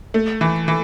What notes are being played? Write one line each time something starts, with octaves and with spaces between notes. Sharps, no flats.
A3
E3
E3